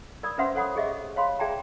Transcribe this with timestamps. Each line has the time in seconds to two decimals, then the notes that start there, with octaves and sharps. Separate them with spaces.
0.23 A#4 D5 B5 D#6
0.38 C#4 B4 C5 E5 F#5 C6
0.55 A4 C#5 F#5 B5 D#6
0.76 G4 G#4 D#5 E5
1.16 C#5 F5 B5 C6
1.40 G#4 D5 E5 G5 A5 A#5